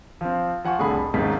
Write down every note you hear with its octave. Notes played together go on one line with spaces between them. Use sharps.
F3 C4
F3 F#5 G#5 C#6
C2 A2 D3 G#4 A4 B5
F1
G#1 D#2 G#2 C#3 B6